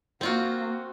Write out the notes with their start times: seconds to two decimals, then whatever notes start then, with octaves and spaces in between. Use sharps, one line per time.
0.21 A#3 C4 F4 F#4